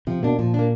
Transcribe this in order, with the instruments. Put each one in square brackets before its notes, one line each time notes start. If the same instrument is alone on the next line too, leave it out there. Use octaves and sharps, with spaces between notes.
[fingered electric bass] C3 [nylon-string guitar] F3
[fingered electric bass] B2 [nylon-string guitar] A#3 D4
[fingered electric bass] A#2 [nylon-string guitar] F3
[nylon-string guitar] A#3 D4